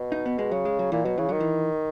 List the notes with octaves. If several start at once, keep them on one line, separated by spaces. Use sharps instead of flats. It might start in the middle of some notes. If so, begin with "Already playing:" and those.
Already playing: B2
D#4
B3
G#3
C#3 F#3
G#3
F#3
A#2 E3
B2 F#3
C#3 E3
D#3 F#3
E3